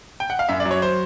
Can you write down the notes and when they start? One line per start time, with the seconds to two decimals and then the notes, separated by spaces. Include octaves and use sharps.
0.20 G5
0.30 F#5
0.39 F5
0.49 F#2 E5
0.60 D5
0.65 F#3
0.71 C#5
0.82 C5